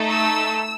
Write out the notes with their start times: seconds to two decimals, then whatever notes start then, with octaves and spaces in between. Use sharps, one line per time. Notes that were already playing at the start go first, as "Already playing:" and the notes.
Already playing: A3 D#4 A4
0.10 E6